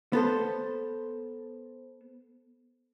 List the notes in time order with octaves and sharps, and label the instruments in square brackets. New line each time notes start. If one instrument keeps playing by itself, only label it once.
[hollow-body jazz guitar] B3 A4 C5